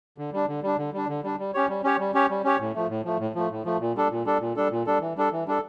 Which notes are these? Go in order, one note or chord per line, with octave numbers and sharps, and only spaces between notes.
D3
G3 D4
D3
G3 D4
D3
G3 D4
D3
G3 D4
G3
C#4 G4 C#5
G3
C#4 G4 C#5
G3
C#4 G4 C#5
G3
C#4 G4 C#5
A2
F3 A3
A2
F3 A3
A2
F3 A3
A2
F3 A3
A#2
G3 D4 A4
A#2
G3 D4 A4
A#2
G3 D4 A4
A#2
G3 D4 A4
E3
G3 D4 A4
E3
G3 D4 A4